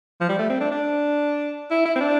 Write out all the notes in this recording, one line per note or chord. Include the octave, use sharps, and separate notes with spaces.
F3
G3
A3
C4
D4
D4
E4
E4
C4
D4